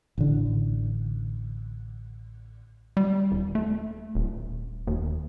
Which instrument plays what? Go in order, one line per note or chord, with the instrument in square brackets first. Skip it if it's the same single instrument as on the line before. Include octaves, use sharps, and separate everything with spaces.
[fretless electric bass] A1 D3
[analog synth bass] G3
D#1
A3
D#1
D#2